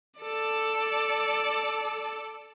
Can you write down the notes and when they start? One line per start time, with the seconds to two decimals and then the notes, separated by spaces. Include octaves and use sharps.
0.21 A4 D5